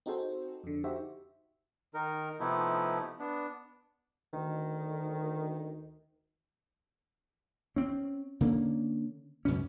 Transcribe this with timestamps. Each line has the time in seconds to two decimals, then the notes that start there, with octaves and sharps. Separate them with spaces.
0.06 C4 D#4 F#4 G#4 A4 C5
0.64 F2 D3
0.84 D#4 F#4 G4 C5 E5
1.94 D#3 D#4 A#4
2.40 C3 F3 A3 B3 D#4 E4
3.19 B3 D4
4.33 D2 D#3
7.76 C4 C#4
8.41 D3 A#3 C4 C#4
9.45 C#2 F#2 B2 C#4